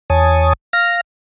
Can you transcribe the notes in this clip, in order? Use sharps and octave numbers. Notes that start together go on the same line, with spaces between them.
E2 C#5 G#5 A5 D#6
F5 F6 A#6